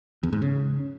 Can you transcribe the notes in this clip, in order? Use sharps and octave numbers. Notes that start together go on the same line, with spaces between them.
E2
G#2
C#3